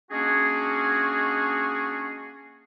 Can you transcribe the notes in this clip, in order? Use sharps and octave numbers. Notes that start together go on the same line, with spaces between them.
G#3 A#3 C#4 D4 F#4 G#4